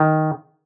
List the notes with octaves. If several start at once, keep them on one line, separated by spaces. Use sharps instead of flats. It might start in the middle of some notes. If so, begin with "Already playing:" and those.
Already playing: D#3